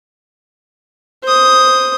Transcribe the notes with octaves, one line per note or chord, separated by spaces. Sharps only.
C5 D#6